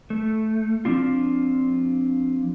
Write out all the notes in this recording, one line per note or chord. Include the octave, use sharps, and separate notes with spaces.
A3
F3 C4 D4 F4